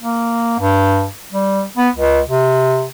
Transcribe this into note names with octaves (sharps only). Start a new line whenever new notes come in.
A#3
G2
G3
B3
C#2
C3